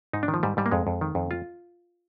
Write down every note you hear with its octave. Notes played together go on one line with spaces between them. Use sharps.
G#2 D#4
D4
D#3
F3
G#2 G3
G#2 G3
A#3
F2 G#3
F2
D#3
F2
F4